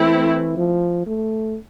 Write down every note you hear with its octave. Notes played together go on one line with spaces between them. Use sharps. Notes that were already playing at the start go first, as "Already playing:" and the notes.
Already playing: E3 A3 C4 E4
F3
A3